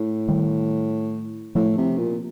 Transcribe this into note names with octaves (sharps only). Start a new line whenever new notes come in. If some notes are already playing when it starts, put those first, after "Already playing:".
Already playing: A2
D#3 G3
A2 F3 A3
C3
A#2